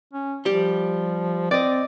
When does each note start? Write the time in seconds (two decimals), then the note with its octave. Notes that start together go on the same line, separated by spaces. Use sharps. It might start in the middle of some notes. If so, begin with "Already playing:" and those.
0.13 C#4
0.45 F3 G3 G4
1.51 C4 D5 D#5